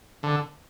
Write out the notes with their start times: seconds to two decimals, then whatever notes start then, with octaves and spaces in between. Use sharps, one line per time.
0.23 D3